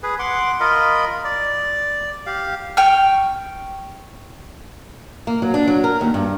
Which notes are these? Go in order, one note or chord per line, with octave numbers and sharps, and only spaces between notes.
G#4 B4
F#5 C6 D6
F4 A#4 D#5 B5
D5
G4 F5
G5 C#6 F6
A#3
F#3
D4
F#3
A#4
D#2
G2